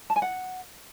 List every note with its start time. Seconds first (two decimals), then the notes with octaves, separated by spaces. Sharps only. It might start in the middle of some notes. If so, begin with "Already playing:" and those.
0.10 A5
0.16 G#5
0.22 F#5